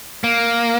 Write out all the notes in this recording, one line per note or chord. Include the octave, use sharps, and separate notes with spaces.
A#3